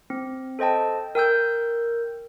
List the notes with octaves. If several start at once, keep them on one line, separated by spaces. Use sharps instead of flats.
C4
A4 C5 D#5 G5 A5
A#4 G5 E6 G6